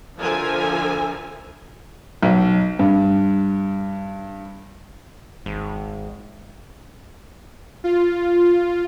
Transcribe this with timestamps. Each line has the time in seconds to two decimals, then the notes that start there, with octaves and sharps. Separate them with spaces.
0.18 D3 F3 F4 A#4 E5 G#5
2.22 B1
2.79 G2
5.46 G#1
7.84 F4